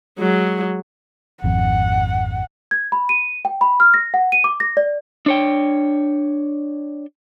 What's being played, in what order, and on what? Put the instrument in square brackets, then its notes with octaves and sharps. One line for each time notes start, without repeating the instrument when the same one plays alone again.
[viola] F#3 G#3
[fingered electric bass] G#1 F2 [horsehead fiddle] F#5
[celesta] G#6
B5
D#7
G5
B5
F6
A#6
F#5
D#7
D6
A#6
D5
[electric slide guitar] D4 C#5 G5